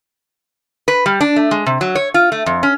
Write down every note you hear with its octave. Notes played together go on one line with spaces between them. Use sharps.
B4
G3
D4
A3
G#3
C3
F#3
C#5
F4
A3
F2
C#4